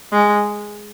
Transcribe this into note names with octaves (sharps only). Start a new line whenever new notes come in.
G#3